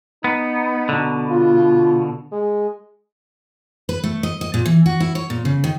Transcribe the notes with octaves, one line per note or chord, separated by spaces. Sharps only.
B3 D#4
B2 D3
F4
G#3
B4
A3
D#5
D#5
A#2
E3
F#4
E4
C#5
A#2
C#3
D#3